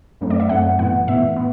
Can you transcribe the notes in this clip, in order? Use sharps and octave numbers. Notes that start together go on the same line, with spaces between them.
F#2 F#3 A3 C4
D5
E5
F#2 F#3 A3 C4 F#5
A2 E3 B3 F#5
A2 E3 B3 E5
B3